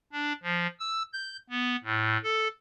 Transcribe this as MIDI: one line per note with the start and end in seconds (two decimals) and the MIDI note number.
0.12 0.33 62
0.43 0.67 53
0.80 1.02 88
1.13 1.37 91
1.50 1.76 59
1.84 2.17 45
2.23 2.48 69